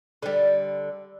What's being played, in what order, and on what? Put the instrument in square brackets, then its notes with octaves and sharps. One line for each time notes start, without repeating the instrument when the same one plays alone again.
[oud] D3 G3